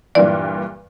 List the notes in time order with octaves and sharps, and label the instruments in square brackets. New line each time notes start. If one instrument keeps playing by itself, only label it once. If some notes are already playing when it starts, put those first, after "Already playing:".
[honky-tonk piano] G2 A#2 E3 [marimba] D5